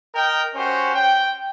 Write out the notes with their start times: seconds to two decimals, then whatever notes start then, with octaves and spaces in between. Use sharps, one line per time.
0.15 A#4 D#5 G5
0.55 C#4 F#4 G4 C5
0.94 G5